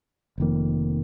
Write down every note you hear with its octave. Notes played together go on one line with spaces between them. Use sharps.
F1 F2 D#3 A#3